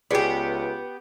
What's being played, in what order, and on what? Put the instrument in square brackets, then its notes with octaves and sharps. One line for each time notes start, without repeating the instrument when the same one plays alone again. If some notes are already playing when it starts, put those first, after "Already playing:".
[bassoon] C#2 [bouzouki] B3 G4 [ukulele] G#4 C#5 D5